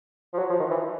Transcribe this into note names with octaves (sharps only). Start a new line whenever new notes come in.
F3
F#3
F3
D#3
E3